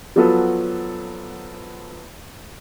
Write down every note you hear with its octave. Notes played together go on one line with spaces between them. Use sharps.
F3 F#3 B3 F4 A4 B4